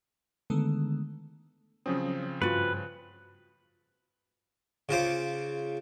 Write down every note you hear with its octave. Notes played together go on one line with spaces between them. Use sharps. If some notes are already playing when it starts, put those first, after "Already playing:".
D3 D#3 G#3 A3 B3 A4
C#3 F3 F#3 C4 C#4 D#6
G2 F4 F#4 B4
C#3 F4 C5 D6